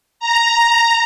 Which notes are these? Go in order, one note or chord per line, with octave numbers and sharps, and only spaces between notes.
A#5